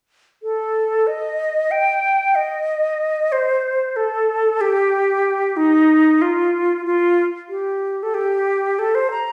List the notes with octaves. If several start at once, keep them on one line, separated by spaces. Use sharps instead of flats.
A4
D#5
G5
D#5
C5
A4
G4
D#4
F4
F4
G4
A4
G4
A4
C5
A#5